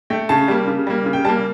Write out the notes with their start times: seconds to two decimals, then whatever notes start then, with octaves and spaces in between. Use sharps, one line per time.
0.10 A3 G5
0.29 C#3 A5
0.48 G3 A#3
0.67 C#3
0.87 G3 A#3
1.06 C#3
1.13 G5
1.24 G3 A5
1.29 A#3